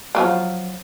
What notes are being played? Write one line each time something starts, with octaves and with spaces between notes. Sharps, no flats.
F3 F#3 A#3